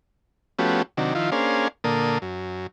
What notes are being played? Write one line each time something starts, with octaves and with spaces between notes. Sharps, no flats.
F3 A3 B3 C#4 F#4 G4
C3 D#3 F#3 D4
D#3 F3 E4 F4
A#3 C#4 D4 G#4 C5 F5
A#2 D3 A#3 A4 D#6
F#2